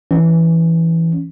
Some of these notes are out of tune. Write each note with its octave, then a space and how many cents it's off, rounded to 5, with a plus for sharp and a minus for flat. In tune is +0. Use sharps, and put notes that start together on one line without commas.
E3 +0 C#4 +0